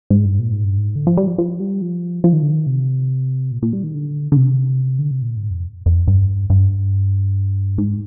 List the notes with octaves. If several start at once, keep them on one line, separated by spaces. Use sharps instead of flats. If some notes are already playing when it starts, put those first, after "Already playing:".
G#2
G2
A#2
G#2
G2
G#2
D3
F3
G3
F3
F3
G3
F3
F3
D#3
D3
D#3
C3
A#2
A#2
G3
D#3
D3
D3
C3
D3
C3
A#2
G#2
F2
F2
G2
G2
G#2